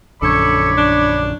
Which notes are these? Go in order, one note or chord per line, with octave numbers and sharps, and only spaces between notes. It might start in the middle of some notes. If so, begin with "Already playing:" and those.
A#1 F#2 D3 A4 C#5 D5 B5
D4